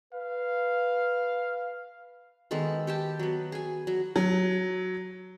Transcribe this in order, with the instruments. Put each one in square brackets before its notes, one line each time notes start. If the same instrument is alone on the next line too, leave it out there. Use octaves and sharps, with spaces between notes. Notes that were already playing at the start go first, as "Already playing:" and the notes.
[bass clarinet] B4 [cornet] F5
[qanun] D#3 G#3 B3 A4
G4 G5 A5
F#3 B3
G#4 G#5
F#3
[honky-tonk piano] F#3